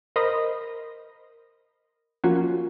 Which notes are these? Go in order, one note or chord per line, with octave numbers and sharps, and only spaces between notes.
A#4 C5 D#5 B5 D#6 A#6
F3 A#3 C#4 F4 F#4